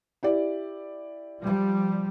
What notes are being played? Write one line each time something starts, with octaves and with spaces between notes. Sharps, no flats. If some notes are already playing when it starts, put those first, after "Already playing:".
E4 G4 D5
F3 G3